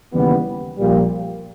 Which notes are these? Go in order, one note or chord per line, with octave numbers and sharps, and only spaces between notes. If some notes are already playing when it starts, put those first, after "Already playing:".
D#2 C#3 E3 G3 B3
A#1 A#2 G3